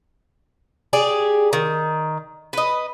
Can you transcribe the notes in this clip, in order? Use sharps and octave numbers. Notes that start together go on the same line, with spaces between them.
G4 G#4 D5
D#3
B4 D#5